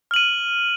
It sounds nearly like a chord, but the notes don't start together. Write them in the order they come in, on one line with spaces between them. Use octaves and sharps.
F6 F#7 D#7